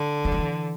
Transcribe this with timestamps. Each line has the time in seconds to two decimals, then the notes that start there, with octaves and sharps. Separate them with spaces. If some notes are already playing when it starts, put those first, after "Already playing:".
Already playing: D3
0.25 E3
0.32 F3
0.39 E3